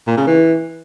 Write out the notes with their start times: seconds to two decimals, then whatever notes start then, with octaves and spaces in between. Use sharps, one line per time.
0.07 A#2
0.17 C#3
0.27 E3